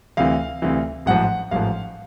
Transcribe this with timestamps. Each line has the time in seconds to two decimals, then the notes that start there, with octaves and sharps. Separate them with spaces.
0.17 D2 C3 E3 F5
0.62 D2 C3 E3
1.06 A1 G#2 F3 F#5
1.51 A1 G#2 F3 F5